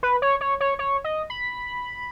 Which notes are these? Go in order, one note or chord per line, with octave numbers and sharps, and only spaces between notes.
B4
C#5
C#5
C#5
C#5
D#5
B5